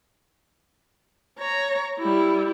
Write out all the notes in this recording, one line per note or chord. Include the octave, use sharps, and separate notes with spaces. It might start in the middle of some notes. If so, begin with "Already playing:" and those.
C#5 A#5
G3 E4